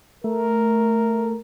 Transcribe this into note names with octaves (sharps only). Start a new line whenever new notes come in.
A3 A#4